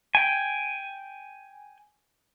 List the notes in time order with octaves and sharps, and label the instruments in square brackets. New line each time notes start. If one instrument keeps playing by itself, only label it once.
[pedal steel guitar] G5 G#5